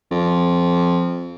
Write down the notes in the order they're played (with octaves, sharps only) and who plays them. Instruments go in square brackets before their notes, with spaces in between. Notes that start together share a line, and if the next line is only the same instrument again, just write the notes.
[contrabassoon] F2